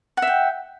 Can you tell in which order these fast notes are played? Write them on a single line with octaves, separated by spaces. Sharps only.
F#5 E5 G5